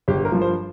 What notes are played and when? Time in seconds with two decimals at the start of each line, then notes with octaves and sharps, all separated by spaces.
0.08 G1 G4
0.25 A#4
0.32 G2 F3
0.42 C5